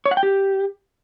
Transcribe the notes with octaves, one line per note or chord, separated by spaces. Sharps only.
C#5
F#5
G5
G4